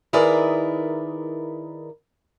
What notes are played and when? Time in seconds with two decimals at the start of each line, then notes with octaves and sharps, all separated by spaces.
0.13 D#3 E4 G#4 A#4 B4 D5